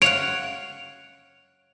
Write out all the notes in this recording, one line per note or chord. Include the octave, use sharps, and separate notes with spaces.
C#5 F5 F#5 D7 F7